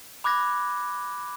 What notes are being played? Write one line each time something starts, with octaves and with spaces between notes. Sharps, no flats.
B5 D6 F#6 G#6 A#6